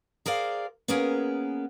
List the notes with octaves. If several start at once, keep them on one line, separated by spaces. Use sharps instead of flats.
G#4 A#4 C5 D5 F5
A#3 B3 C#4 G#4 A#4